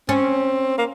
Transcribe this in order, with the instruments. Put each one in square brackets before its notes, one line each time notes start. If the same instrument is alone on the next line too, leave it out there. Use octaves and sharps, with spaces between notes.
[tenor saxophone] C4 [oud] C#4
[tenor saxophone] A#3